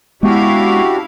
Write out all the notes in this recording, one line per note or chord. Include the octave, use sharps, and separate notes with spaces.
G#3 B3 C#4 D4 E4 F#4 G4 F5